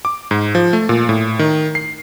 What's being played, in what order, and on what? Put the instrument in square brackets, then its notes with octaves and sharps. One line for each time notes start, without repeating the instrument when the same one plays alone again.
[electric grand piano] D6
G#2
F3
A3
A#2
A2
D#3
C7